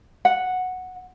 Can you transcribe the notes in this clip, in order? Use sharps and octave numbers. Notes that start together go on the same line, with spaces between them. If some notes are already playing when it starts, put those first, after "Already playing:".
F#5